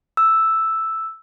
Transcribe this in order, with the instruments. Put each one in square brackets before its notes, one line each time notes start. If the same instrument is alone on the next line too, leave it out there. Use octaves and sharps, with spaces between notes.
[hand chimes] E6